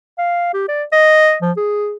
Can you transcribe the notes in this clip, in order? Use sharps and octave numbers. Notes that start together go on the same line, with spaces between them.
F5
G4
D5
D#5
F3
G#4